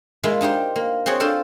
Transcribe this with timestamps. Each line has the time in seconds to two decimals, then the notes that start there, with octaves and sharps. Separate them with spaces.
0.23 G#3 A#3 E4 F4
0.41 D4 D#4 G4 C5
0.76 A#3
1.06 C4 F#4 G#4 C#5
1.20 D4 F4 A4 C5